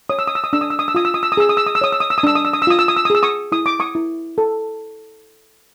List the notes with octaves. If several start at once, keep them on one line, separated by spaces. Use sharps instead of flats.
C#5 D#6
E6
D#6
E6
D#6
D4 E6
D#6
E6
D#6
E6
F4 D#6
E6
D#6
E6
D#6
G#4 E6
D#6
E6
D#6
E6
C#5 D#6
E6
D#6
E6
D#6
D4 E6
D#6
E6
D#6
E6
F4 D#6
E6
D#6
E6
D#6
G#4 E6
C#6 D#6
E4 D#6
D6
C#6 D#6
E4
A4